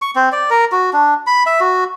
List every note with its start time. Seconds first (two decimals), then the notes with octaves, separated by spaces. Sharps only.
0.02 C#6
0.16 C4
0.32 D5
0.50 A#4
0.72 F#4
0.93 D4
1.27 B5
1.46 E5
1.61 F#4